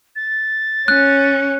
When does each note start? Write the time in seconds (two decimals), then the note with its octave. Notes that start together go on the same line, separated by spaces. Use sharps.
0.16 A6
0.88 C#4 F#6